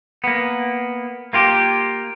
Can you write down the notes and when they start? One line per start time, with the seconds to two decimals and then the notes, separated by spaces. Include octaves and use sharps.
0.24 A#3 B3
1.33 A#3 F4 G4